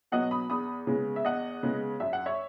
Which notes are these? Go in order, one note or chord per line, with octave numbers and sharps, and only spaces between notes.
B2 F#3 B3 D#5 F#5
B5 D#6
E2 B5 D#6
C#3 G#3 B3
E5
E2 D#5 F#5
C#3 G#3 B3
F#2 E5
F#5
C#5 E5